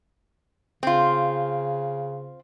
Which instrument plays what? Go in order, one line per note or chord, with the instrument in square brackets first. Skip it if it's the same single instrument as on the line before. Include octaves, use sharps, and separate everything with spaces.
[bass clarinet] C#3 [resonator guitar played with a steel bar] C4 F4